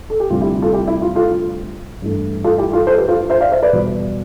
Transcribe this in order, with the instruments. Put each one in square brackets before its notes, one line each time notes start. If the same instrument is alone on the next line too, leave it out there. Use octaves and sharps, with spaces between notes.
[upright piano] A4
G4
D2 C3 G3 F4
E4 G4
F4 A4
E4 G4
E4
F4
F4 A4
G2 E3 A3
F4 A4
E4 G4
F4 A4
A4 C5
G4 B4
F4 A4
C5 E5
D5 F5
C5 E5
B4 D5
E2 B2 G3